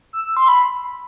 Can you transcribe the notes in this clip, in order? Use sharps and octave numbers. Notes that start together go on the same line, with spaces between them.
E6
E6
C6
B5